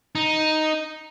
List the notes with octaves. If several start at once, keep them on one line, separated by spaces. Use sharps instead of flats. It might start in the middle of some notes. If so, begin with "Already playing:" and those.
D#4